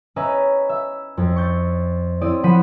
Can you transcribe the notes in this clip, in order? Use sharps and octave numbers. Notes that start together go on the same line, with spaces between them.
C#4 B4 D#5 E5 A#5
E5
F2
C#6 G6 A6
C4 E4 D5 D#6
F3 F#5 B5 B6 D#7 E7